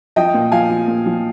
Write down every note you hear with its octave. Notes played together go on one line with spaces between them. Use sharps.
F3 D#5 G5
A#2
F3 F5 G#5
F3
A#2
F3